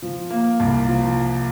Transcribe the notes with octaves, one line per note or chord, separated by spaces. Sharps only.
F3
A#3
C2
F3